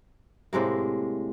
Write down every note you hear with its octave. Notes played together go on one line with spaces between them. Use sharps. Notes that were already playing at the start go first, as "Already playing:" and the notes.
A2 C3 G#3 A#3